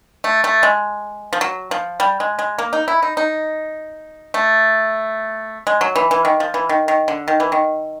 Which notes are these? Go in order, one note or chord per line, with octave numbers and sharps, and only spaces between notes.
A3
A3
G#3
F3
F#3
F3
G3
G#3
G#3
A#3
D#4
E4
D#4
D#4
A3
G#3
F#3
E3
E3
D#3
F3
E3
D#3
D#3
D3
D#3
E3
D#3